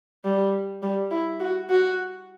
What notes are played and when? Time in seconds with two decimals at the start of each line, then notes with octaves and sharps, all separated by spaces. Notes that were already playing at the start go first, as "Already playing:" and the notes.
0.24 G3
0.82 G3
1.11 E4
1.40 F#4
1.70 F#4